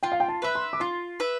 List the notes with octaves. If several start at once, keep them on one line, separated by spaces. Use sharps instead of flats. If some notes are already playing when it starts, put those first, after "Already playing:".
F4 G5
F5
G5
A5
B4 E5 B5
C6
D6
F4 C6
B4 E5